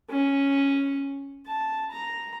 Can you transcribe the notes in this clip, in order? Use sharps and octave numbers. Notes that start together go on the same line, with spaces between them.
C#4
A5
A#5